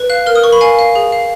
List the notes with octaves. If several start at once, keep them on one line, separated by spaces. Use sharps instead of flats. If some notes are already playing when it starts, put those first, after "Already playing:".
Already playing: B4
F5 F#6
A#4 F6
D#6
A#4 C#6
B5
F5 G#5
F5
G#4
F5